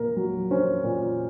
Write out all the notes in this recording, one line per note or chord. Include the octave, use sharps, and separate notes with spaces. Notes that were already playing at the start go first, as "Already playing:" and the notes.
Already playing: A#2 A#3 A#4
F#3
C#4 C5
A#2